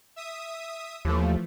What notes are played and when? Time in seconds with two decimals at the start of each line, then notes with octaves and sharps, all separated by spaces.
0.16 E5 D#6
1.05 D#2 E3 F3 A3